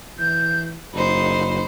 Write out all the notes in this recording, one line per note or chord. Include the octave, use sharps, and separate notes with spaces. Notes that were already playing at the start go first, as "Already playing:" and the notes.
E3 G6
F#1 D#4 C5 B5